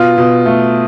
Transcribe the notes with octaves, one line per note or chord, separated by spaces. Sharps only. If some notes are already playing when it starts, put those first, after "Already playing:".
Already playing: B2 F4
B2
A3